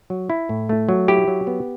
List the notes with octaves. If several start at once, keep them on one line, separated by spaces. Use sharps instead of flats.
F#3
E4
A2
A3
F#3
E4 G4
F#3
B3